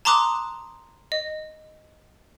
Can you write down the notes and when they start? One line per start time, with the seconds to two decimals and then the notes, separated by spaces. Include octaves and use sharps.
0.05 A5 A#5 C6 D6 D#6 F#6
1.12 D#5